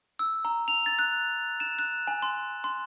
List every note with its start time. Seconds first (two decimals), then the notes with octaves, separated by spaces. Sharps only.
0.19 E6
0.45 A#5
0.68 F7
0.86 A6
0.99 F#6
1.60 E7
1.79 F#6
2.07 G#5
2.22 C6
2.64 C6